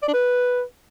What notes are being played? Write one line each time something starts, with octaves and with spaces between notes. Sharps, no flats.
D5
D4
B4